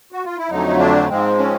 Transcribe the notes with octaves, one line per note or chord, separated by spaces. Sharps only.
F#4
F4
E4
F2 D3 F#3 A3 D#4
D4
G#2 F3 G#3 C4
C#4